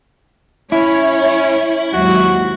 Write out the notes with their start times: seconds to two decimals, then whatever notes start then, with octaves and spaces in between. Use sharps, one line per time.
0.72 C#4 E4 C#5
1.93 D#2 G#2 F#3 F#4